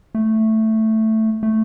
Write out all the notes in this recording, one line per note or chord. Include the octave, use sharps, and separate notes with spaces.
A3
A3